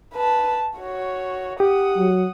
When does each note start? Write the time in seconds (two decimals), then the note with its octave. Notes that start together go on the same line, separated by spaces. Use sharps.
0.14 B4 A5
0.78 F#4 C#5
1.60 G4 F#5 D#6
1.98 F#3